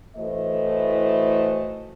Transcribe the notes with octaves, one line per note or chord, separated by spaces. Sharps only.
A2 E3 A3 F#4 C5 D#5